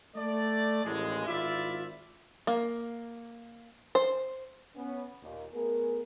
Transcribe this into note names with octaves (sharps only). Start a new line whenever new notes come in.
A3 D5
A1 D#2 A2 G#3
G#1 E4 F4 D5 E5
A#3
C5
B3 C#4
D#2 A#2
A3 B3 G#4 A#4